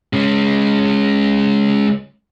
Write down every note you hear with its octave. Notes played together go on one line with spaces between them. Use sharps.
G#3 C#4